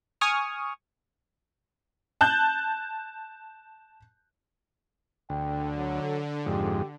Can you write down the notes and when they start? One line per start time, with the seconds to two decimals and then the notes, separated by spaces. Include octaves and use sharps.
0.21 G#5 C#6 D#6 F6
2.21 A5 F#6 G6
5.30 D2 D3 G5
5.77 F#3
6.46 F2 G#2 G4